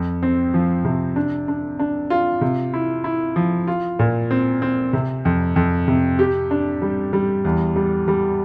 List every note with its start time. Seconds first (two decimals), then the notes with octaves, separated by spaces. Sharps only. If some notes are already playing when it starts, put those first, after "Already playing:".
Already playing: F2
0.23 C4
0.54 F3
0.85 C3
1.16 D4
1.48 D4
1.79 D4
2.10 F4
2.41 C3
2.74 E4
3.04 E4
3.36 F3
3.67 F4
3.99 A#2
4.31 C4
4.62 C4
4.93 C3
5.25 F2
5.56 F2
5.88 C3
6.19 G4
6.51 D4
6.82 G3
7.13 G3
7.45 E2
7.76 G3
8.08 G3